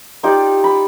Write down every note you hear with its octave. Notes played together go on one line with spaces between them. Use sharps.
D#4 F4 G4 D5
B5